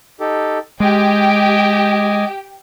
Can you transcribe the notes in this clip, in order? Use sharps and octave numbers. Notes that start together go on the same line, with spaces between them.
D#4 G4 A4
G#3 G4 D#5 G5 G#5 D6